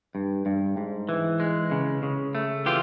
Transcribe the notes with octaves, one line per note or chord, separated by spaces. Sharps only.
G2
G2
G#2
E3
G#3
C#3
C#3
A3
E3 F4 G4